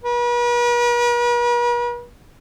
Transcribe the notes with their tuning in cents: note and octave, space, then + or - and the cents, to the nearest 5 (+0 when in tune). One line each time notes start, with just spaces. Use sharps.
B4 -45